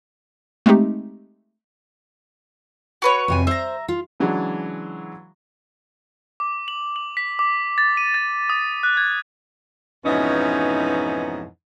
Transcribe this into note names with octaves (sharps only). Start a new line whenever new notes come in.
G#3 A3 C4 D#4 G4
F#4 B4 C#5
F2 C3 G#5
C5 E5 A#5
F4
C#3 E3 F#3 G#3 D4
D6
F#7
F#7
B6
D6
A6
D#7
A6
D#6
F#6
G#6
F2 G#2 B2 E3 C#4 D#4